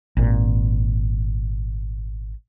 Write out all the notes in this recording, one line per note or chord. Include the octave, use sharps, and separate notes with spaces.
G#1 A#2